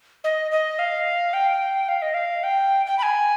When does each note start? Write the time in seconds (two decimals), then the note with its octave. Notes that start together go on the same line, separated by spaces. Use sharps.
0.24 D#5
0.52 D#5
0.79 F5
1.34 G5
1.89 F5
2.02 D#5
2.14 F5
2.44 G5
2.86 G5
2.98 B5
3.03 G#5